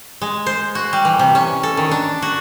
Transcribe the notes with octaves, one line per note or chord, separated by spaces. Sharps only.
G#3
C5
F#4
G3
E3
C3
C#4
A4
D#3
D4
F#4